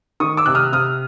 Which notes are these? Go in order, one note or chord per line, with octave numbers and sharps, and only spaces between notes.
D#3 C#6 D#6
D6 E6
C3 F#6
D#6 F6
C3 D#6 F6